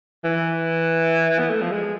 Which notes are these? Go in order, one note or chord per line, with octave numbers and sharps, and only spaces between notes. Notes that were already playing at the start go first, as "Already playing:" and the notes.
E3
B3
A3
F3
G#3